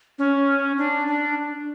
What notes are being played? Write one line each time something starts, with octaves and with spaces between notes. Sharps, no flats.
C#4
D4
D4